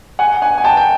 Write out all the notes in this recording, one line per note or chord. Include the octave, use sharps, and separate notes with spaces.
F#5 G#5
F#5 G#5
G#5
G5 A5
G5